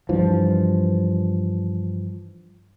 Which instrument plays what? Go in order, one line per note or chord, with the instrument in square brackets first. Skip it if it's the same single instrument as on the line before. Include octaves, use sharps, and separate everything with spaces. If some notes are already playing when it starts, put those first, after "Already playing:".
[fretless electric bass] G2 E3 F3